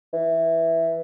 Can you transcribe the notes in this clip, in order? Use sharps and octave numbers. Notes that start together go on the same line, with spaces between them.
E3